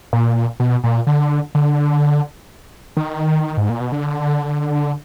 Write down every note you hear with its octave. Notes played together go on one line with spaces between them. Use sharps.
A#2
B2
A#2
D3
D3
D#3
G#2
A#2
B2
D3